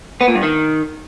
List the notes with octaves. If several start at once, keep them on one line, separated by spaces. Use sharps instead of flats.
B3
A#2
G2
D#3